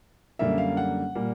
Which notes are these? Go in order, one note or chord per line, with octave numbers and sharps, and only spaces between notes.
F#2 D3 G3 A#3 E5
F5
F#5
A#2 G3 A#3